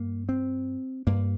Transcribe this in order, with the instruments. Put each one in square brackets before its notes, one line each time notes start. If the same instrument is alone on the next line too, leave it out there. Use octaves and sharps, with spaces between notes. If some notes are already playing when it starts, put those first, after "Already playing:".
Already playing: [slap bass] G2 A#3
C4
G2 A#3